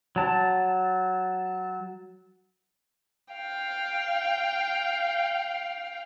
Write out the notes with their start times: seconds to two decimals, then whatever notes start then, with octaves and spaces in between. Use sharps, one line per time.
0.16 F#3 A5
3.34 F5 G5